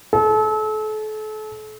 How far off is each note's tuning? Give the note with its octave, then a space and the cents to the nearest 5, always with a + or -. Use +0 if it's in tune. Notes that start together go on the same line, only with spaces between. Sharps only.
A4 -35